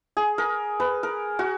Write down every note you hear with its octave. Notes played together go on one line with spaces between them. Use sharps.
G#4
A#4
B4
A#4
F#4